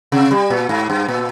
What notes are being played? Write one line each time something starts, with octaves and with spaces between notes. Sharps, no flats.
C3
G3
A#2
G#2
G2
A#2